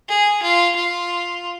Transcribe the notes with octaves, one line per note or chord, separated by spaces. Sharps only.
G#4
F4
F4